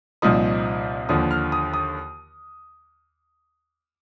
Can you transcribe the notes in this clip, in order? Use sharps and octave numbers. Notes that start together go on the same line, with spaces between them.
C2 A#2 F3 C4 D#4 D#6
D#2 D3 F3 D#6
F6
D#6
D#6